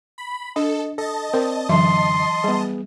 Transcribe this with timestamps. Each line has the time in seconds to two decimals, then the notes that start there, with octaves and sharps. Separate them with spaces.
0.18 B5
0.56 D4 A4 D#5
0.98 A4 D#5 A5
1.34 C4 A#4 D5
1.69 F#2 D3 E3 F#3 E5 C6
2.44 G3 B3 G#4